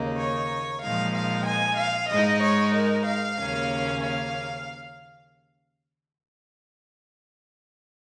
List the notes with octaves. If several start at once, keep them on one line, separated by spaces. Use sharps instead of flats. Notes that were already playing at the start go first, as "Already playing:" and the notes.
Already playing: D#2 C#3 A#3 D#4
C#5
A#2 F3 G#3 D#4 F5
F5
G#5
F5
G#2 G#3 D#4 D#5
C#5
A#4
F5
D#2 C#3 A#3 C#4
F5